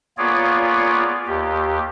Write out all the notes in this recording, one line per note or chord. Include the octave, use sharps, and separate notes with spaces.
A#3 B3 F4 G#4 C#5 D5
D#2 G4